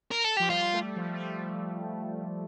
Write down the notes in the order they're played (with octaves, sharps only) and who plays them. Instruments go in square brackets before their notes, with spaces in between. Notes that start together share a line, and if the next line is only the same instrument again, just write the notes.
[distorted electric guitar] A#4
A4
[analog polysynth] F3 [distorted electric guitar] G4
[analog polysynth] G3 [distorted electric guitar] F4
[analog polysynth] A3
G3
F3
A3
G3